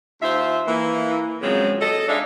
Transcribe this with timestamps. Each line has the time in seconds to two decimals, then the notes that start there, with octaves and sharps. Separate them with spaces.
0.21 D#2 F4 C5 E5
0.67 E3 A#3
1.42 A#2 C#3 F3 F#3 G#3 C4
1.81 A4 D#5
2.08 G#3 D4 D#4 E5 F5